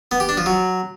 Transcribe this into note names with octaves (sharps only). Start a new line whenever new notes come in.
B3
G4
D4
F3
F#3